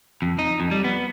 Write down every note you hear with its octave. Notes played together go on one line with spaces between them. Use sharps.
F2
D#4
F2
G3
B3